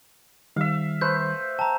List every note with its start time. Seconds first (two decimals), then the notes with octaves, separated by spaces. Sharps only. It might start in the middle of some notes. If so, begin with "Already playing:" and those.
0.56 D#3 G3 E5 F5
1.01 A3 B4 C5 G6
1.59 G5 A5 A#5